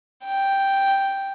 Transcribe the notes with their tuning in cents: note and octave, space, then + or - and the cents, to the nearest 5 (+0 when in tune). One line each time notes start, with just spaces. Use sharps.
G5 +0